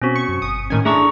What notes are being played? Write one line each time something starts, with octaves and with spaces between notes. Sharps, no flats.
B2 C4 C#4 F#4
C#6 C#7
F#2
G1 D#6
A2 D#3 C#4 G#5
A3 D4 E4 G#4 A#5 C#6